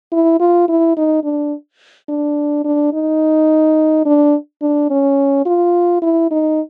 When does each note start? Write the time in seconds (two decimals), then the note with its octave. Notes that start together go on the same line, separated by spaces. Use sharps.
0.12 E4
0.40 F4
0.68 E4
0.97 D#4
1.24 D4
2.09 D4
2.64 D4
2.93 D#4
4.05 D4
4.62 D4
4.90 C#4
5.46 F4
6.02 E4
6.31 D#4